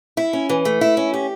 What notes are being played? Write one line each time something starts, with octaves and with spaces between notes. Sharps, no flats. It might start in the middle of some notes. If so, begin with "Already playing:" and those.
E4
C#4
E3
A3
E4
C#4
G4